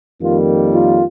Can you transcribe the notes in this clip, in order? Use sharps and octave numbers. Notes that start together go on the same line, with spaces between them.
F2 D#3 G3 A#3 F4
F4